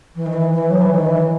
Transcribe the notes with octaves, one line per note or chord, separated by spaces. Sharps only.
E3
D#3
E3
E3
F#3
E3
D#3
E3